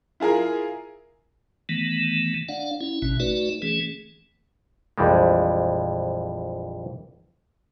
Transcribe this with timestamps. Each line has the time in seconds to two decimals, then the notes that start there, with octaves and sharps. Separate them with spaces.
0.20 E4 F4 G#4 A#4
1.69 D#3 E3 A3 B3
2.49 D4 D5 F5 F#5
2.81 C#4 E4
3.02 A1 B2 C#4
3.20 A3 D#4 F#4 B4 D5
3.62 E3 A3 C#4 G#4
4.98 A#1 F2 E3 G3 G#3